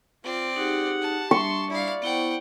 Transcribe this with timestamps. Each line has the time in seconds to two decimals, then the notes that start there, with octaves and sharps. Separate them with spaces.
0.24 C4 F4 D5
0.56 D#4 G4 G#4 F#5
1.01 A5
1.31 G3 D4 E5 C6 C#6
1.70 E4 D5 F5
2.02 B3 E4 C5 F#5 G5